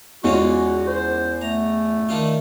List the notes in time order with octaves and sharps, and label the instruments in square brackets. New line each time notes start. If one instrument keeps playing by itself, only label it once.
[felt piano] E2 [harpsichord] G#3 C#4 F4 [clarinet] F#4
[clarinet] C5
[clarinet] A3 [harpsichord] A#5
[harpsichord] D#3 D4 F4